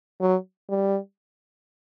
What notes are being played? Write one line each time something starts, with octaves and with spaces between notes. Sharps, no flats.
F#3
G3